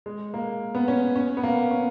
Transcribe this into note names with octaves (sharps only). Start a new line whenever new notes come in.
G#3
A#3
B3
C#4
C#4
B3
A#3
C#4